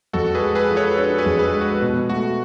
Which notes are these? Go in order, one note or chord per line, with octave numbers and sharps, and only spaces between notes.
F2 F#4 A4
G#4 B4
G#3
G#4 B4
F3
A4 C#5
D4 A4 C#5
G#4 B4
F2
G#4 B4
G#3
F#4
B2
A3 F#4